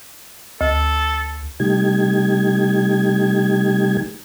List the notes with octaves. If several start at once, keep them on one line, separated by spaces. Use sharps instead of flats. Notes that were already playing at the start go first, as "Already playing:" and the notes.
D2 A4
C3 G3 A3 D#4 G4 G#6